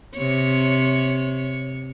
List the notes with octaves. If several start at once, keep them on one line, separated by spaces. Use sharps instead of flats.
C3 C#5